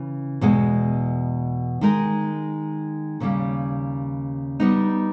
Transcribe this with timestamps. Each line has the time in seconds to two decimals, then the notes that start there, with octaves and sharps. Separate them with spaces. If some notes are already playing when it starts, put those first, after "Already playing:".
Already playing: C#3 E3
0.41 E2 B2 G#3
1.81 D#3 G#3 D#4 A#4
3.20 D#2 C#3 G3 A#3
4.60 G3 B3 D#4